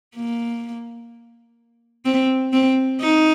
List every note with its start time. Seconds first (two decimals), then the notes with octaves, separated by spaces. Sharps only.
0.15 A#3
2.05 C4
2.53 C4
3.00 D#4